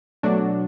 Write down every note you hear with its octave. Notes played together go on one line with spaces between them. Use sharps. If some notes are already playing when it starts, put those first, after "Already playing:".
B2 F#3 A3 D4 F#4